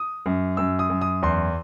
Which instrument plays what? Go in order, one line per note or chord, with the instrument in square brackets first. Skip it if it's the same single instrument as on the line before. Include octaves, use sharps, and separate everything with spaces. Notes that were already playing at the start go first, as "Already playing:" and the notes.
Already playing: [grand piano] D#6
F#2
F#2 E6
D#6
F#2
D#6
E2 C6